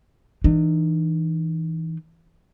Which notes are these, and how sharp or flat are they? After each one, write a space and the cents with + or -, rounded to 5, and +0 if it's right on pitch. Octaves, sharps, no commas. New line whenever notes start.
E3 -25 D#4 -40